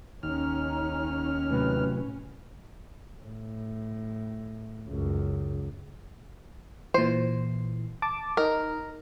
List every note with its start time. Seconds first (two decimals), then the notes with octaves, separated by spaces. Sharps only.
0.23 D#2 C#4 D#4 F6
1.51 A2 C3 F#3 B4
3.21 A2
4.88 C#2 F#2
6.94 A#2 E3 C5
8.02 A5 D6
8.37 D#4 A#4